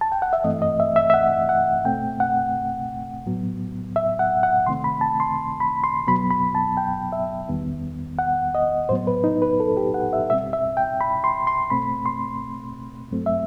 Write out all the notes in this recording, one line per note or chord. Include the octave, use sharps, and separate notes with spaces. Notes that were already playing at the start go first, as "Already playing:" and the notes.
A5
G5
F#5
E5
G2 E3 A3 C4 D#5
D#5
E5
E5
E5
F#5
F#5
B2 A3 C4 G5
F#5
A2 F#3 B3
E5
F#5
F#5
C3 D#3 A3 C4 C6
B5
A5
C6
B5
C6
B2 F#3 B3 B5
B5
A5
G5
E5
E2 D#3 G3 B3
F#5
D#5
A2 F#3 B3 C5
B4
D#4
B4
A4
G4
F#5
E5
B2 G3 C4 E5
E5
G5
B5
C6
C6
B2 A3 C4 B5
C6
G2 F#3 A3 C4
E5